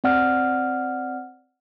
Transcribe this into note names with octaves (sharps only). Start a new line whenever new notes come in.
C4 D5 F#5 F6